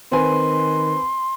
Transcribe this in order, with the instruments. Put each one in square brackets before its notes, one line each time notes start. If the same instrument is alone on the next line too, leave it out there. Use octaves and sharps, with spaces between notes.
[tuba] D#3 [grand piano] C4 B4 G#5 [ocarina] C6